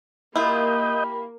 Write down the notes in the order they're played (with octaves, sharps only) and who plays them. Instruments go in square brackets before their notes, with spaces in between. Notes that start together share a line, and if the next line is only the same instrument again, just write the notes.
[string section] A#3 [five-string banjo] E4 F4 [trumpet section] G4 B5 [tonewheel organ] D#5 D#6 G6